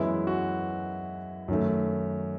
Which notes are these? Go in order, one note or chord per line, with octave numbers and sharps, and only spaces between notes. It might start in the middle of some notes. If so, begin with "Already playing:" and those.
Already playing: F#2 E3 G#3 B3 E4
F#4
F#2 D#3 A3